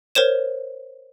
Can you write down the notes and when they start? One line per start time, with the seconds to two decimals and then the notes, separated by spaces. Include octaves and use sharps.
0.15 A#4 C5 C#5 E7